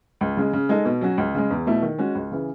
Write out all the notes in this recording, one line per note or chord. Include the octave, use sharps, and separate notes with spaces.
C#2
C#3 G#3
C#3
G#3 D#4 A4
B2
F#3 C#4 F#4
C#2
C#3 G#3
E2
B2 A3 E4
D#3
G#3 C#4 F#4
C#2
C#3 E3